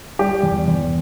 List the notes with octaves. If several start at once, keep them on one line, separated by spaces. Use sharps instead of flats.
G3 G4
E2
E2